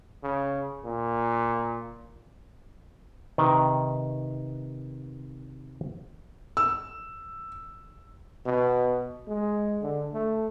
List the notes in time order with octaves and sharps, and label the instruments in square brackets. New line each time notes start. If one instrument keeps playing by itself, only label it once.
[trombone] C#3
A#2
[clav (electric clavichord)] C3 D#3 B4 D#5
[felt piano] E6
[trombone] B2
G#3
D3
A3